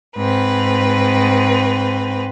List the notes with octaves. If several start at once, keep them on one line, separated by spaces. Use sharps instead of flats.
G#2 C4 B4